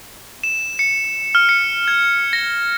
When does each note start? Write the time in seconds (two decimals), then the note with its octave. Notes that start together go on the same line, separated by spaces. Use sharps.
0.44 E7
0.79 C#7
1.35 F6
1.49 C#7
1.88 G#6
2.33 A#6